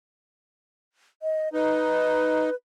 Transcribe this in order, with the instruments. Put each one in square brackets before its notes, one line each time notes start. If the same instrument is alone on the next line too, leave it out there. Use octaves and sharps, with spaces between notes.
[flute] D#5
[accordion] D#4 [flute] B4